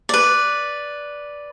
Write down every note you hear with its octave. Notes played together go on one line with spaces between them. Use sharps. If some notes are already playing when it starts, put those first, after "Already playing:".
B4 D5